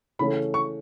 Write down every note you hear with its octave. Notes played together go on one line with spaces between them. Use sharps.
C#3 E3 A3 C#4 B5
C#6